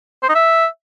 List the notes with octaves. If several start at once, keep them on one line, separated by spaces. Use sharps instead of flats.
C5
D#4
E5